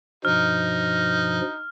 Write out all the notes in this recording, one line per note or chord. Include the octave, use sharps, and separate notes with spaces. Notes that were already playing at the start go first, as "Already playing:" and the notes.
G2 B2 F3 D#4 F6